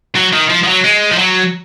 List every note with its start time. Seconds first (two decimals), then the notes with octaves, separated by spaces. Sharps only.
0.16 F#3
0.33 D#3
0.50 F3
0.63 F3
0.67 F#3
0.84 G#3
1.11 F3
1.18 F#3